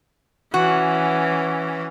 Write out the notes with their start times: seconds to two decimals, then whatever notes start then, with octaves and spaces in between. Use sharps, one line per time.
0.54 E3 C#4 F#4